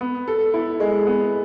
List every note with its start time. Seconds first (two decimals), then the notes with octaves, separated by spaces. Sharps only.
0.01 B3
0.28 A4
0.54 E4
0.80 G#3
1.07 B3